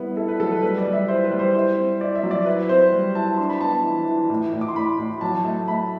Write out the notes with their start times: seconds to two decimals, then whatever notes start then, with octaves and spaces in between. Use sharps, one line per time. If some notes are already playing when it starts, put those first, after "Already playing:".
Already playing: G3 B3 E4
0.17 E4 A4
0.28 B4
0.40 F#3 A4
0.52 B4
0.62 G3 B4
0.78 D5
0.86 G3
0.93 E5
1.08 E4 C5
1.24 B4
1.31 G3
1.39 C5
1.54 E4 C5
1.77 C4
2.01 E4 D5
2.15 E5
2.23 F#3
2.31 D5
2.46 E4 B4
2.69 C4 C5
2.92 G3
3.15 E4 A5
3.37 D4 C6
3.49 B5
3.61 B3 A5
3.83 E3
4.07 E3
4.30 A2
4.53 A2
4.61 D6
4.68 C6
4.75 A2 B5
4.98 A2
5.21 F#3 A5
5.44 A3 A5
5.68 A3 B5